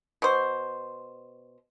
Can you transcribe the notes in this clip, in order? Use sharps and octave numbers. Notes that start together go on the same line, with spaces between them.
B2 C5